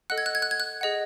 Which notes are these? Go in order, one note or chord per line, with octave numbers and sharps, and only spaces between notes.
A4 D#5 F#5 F#6
G#6
F#6
G#6
F#6
G#6
F#6
G#4 D#5 F#5